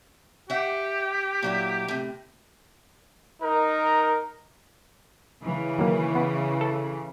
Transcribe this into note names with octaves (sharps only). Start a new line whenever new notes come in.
G4 E5 F#5
A#2 F#3 E4
A2 C3
D#4 A#4
C#3 E3
D#3 F#3 A#3
B3
A4